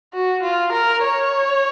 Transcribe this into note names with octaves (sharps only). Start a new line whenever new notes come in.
F#4
F4
A#4
C#5